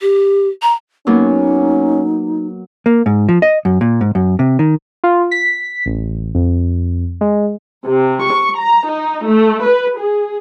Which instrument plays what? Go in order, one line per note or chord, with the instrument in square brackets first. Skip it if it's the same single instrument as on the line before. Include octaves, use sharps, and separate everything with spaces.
[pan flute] G4
A#5
[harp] F#3 A#3 B3 [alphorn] C#4 [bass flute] D#4
[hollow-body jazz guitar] A#3
G#2
F3
D#5
F#2
A#2
G#2
F#2
C3
D#3
[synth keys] F4
B6
A1
F2
G#3
[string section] C3
C#6
A#5
D#4
A3
B4
G#4